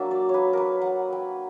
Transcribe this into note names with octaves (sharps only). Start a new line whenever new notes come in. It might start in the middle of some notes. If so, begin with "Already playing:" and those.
Already playing: F#3 A#3 D4 E5
D5
C#5
B4
A#4 B4
F#5
G5